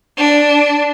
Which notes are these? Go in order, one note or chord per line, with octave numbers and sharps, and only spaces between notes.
D4